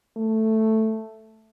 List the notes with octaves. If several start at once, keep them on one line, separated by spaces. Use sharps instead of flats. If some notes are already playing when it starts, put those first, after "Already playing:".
A3